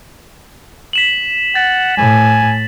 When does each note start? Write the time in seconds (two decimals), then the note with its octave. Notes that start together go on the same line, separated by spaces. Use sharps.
0.93 B6 E7 F#7
1.55 F#5 A6
1.97 A2 G#5